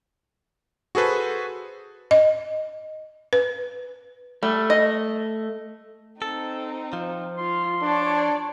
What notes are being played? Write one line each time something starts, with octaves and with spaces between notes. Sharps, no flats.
F#4 G#4 A4 B4 C5
D#5
B4
G3 A3
D#5
C4 D#4 A4
F3
F4 C6
D4 C#5 D5 A5